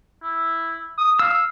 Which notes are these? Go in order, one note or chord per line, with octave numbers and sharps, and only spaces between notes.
E4
D#6
F5 E6